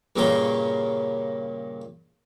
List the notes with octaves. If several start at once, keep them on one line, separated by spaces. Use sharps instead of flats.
G2 A#2 C#3 A#3 C#5 C6